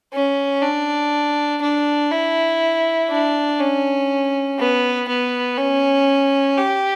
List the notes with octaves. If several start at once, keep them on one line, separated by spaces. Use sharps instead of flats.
C#4
D4
D4
E4
D4
C#4
B3
B3
C#4
G4